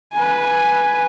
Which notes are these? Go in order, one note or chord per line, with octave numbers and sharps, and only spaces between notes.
B4 G#5